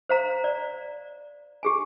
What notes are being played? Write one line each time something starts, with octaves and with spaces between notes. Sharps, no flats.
C5 F5 A#5
D5
G4 G#4 G#5